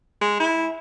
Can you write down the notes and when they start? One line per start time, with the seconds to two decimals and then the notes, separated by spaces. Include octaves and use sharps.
0.21 G#3
0.40 E4